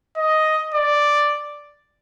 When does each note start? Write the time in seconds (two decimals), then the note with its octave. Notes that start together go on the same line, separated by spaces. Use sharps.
0.17 D#5
0.74 D5